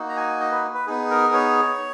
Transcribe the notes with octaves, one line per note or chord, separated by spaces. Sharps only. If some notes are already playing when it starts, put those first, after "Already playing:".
Already playing: A#3 D#4 F#4
A#5
G#5
D#5
B4
B4
B3 D#4 G#4
A#4
C#5